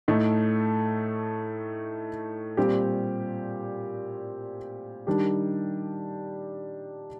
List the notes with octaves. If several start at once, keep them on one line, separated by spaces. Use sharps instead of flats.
A2 A3 D#4 A4
A#2 G3 C4 G4
D#3 G3 D4 G4